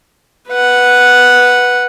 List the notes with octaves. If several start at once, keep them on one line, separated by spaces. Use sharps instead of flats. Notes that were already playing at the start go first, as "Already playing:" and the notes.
B4 F#5